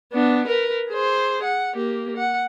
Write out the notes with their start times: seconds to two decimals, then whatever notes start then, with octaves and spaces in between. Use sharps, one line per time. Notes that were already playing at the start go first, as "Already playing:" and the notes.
0.13 B3 D4
0.47 A#4 B4
0.90 G#4 C5
1.43 F#5
1.76 A#3 G4
2.17 F#5